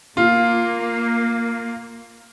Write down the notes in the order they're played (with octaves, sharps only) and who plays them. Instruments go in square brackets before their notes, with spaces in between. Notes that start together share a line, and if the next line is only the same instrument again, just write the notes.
[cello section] A#3 [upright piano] F4